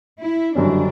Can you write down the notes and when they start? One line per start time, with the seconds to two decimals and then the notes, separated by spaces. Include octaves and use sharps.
0.20 E4
0.55 F#1 F#2 D3 G3 C#4 D4